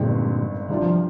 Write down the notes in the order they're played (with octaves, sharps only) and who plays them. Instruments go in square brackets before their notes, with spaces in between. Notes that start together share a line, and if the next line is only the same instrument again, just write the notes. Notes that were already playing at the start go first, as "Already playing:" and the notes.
Already playing: [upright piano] G1 G2 D#3 G#3 C4 [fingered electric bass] A#2 D3
[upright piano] C2 C3 G3 D4 F4 [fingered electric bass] D#3
[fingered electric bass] F3